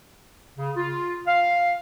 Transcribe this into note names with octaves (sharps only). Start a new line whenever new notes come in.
C#3
F4
F5